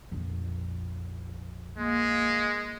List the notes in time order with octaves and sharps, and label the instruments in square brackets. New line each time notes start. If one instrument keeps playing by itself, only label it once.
[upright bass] A#1 F2
[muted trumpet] G#3 [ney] A#3